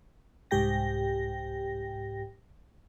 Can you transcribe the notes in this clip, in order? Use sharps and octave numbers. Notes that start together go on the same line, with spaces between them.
C2 G#2 G4 G5 A#6